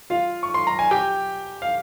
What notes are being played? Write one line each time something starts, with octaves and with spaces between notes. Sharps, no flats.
F4 F5
C#6
C6
A#5
G#5
G4 G5
F5